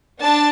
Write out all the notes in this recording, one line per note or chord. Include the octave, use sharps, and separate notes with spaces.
D4 A5